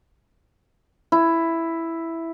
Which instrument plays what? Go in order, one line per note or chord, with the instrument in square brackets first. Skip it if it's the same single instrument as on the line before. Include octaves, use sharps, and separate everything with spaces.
[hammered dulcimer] E4